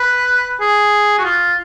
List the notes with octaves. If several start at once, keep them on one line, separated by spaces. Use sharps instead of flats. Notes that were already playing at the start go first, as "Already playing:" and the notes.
Already playing: B4
G#4
F#4
F4